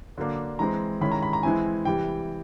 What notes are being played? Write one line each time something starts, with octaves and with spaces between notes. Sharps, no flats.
D3 F#3 A#3 D4
E3 G#3 C4 A#5
D#3 G#3 C#4 E4 B5
A#5
B5
A#5
E3 G#3 C4 E4 G#5
C3 E3 G3 G5